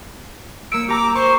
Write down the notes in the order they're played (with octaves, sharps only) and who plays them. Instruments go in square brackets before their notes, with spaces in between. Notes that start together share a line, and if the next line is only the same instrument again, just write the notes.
[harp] A#3 C#7 D7 [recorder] E6
[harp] G4 A#5 E6 [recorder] D6
[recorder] C5 [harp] C#6